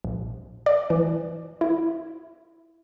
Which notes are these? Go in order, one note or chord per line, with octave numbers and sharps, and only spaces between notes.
A#1
D5
E3
E4